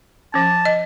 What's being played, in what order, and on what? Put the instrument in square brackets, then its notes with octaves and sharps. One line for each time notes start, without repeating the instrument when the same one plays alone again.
[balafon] F3 C#4 [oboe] A5
[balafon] D#5